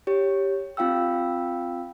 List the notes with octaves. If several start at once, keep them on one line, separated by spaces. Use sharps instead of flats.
G4 C#5
C4 F4 F5 G5 E6